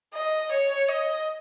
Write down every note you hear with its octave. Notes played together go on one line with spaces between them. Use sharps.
D#5
C#5
D#5